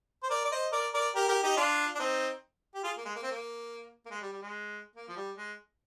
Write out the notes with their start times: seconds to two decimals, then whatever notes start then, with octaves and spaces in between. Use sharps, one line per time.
0.23 C5
0.30 A#4 D5
0.45 D5
0.52 C5 D#5
0.72 A#4 D5
0.94 A#4 D5
1.15 G4 A#4
1.28 G4 A#4
1.43 D#4 G4
1.57 D4 F4
1.95 D4
1.99 C4 D#4
2.74 G4
2.84 F4 G#4
2.97 A#3
3.05 G#3
3.16 A#3
3.23 C4
3.31 A#3
4.06 A#3
4.11 G#3
4.21 G3
4.33 G3
4.42 G#3
4.96 A#3
5.08 F3
5.16 G3
5.37 G#3